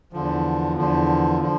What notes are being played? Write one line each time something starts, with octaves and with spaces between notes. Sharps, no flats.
E2 D3 F3
E2 D3 F3
D3 F3